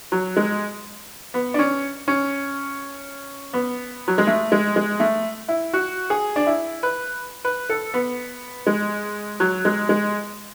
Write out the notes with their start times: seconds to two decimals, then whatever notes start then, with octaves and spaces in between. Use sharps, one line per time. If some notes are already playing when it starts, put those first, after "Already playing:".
0.12 F#3
0.37 G#3
1.34 B3
1.54 D4
1.59 C#4
2.08 C#4
3.53 B3
4.08 F#3
4.18 G#3
4.27 A3
4.52 G#3
4.76 G#3
5.00 A3
5.48 E4
5.73 F#4
6.10 G#4
6.36 D4
6.47 E4
6.83 B4
7.45 B4
7.69 A4
7.94 B3
8.67 G#3
9.40 F#3
9.65 G#3
9.89 G#3